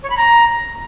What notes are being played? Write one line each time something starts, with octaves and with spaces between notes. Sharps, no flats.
C#5
B5
A#5